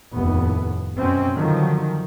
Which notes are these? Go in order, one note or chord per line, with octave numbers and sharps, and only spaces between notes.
F1 D#2 A2 B3
F#2 B2 C4 C#4
D3 D#3 F3 F#3